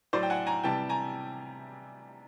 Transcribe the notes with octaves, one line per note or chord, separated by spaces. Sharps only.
A2 F#3 C5 D5
G5
F#5 G#5
G#5 A#5
C3 E3 G3 G5 A5
G#5 A#5